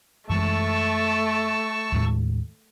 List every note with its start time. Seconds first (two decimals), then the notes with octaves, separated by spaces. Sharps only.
0.29 F#2 E3 G#3 A3 A5 C#6 E6
1.92 D#2 A2 G#3